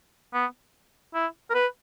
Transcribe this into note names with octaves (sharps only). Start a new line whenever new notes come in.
B3
E4
A#4
B4